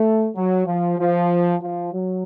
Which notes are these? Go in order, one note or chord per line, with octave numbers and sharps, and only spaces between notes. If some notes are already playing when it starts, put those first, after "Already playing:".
Already playing: A3
F#3
F3
F3
F3
F#3